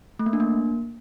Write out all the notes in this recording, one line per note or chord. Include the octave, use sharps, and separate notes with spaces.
A3
A#3
D4
A#3